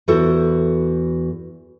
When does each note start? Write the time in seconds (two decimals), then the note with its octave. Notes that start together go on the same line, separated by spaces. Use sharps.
0.08 E2 E4 F#4 A4 C5